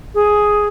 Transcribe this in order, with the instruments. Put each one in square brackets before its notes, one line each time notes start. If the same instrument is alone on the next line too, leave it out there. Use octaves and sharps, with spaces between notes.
[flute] G#4